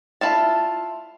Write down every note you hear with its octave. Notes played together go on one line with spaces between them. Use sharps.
E4 F4 A5